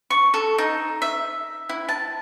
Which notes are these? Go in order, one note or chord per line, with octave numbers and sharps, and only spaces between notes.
C#6
A4
D#4
E5
E4
A5